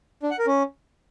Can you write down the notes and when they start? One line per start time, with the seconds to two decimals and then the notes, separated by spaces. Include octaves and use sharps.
0.23 D4
0.31 F#5
0.39 A#4
0.47 C#4